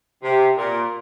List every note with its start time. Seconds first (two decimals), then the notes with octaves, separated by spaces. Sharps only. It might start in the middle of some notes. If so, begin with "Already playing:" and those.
0.23 C3
0.57 A#2